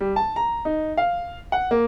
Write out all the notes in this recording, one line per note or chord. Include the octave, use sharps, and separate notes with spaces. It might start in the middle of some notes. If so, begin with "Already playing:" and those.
G3
A5
A#5
D#4
F5
F#5
A#3